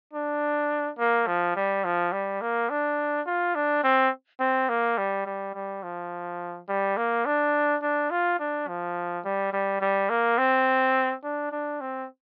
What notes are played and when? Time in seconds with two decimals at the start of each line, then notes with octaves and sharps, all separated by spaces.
0.13 D4
0.99 A#3
1.27 F3
1.56 G3
1.84 F3
2.12 G3
2.41 A#3
2.70 D4
3.26 F4
3.55 D4
3.84 C4
4.40 C4
4.69 A#3
4.97 G3
5.26 G3
5.54 G3
5.83 F3
6.68 G3
6.97 A#3
7.26 D4
7.82 D4
8.11 F4
8.39 D4
8.68 F3
9.25 G3
9.53 G3
9.81 G3
10.10 A#3
10.38 C4
11.24 D4
11.52 D4
11.81 C4